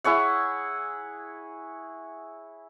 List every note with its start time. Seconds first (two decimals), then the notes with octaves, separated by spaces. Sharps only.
0.04 E4 G#4 C#5 F#5